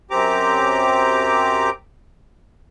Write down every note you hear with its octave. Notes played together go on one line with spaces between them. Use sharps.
F#2 C4 G4 A#5 D6